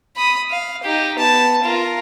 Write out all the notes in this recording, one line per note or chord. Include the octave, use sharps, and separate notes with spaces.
B5 D#6
F5
D#4 G4
B3 A5
F4 A#4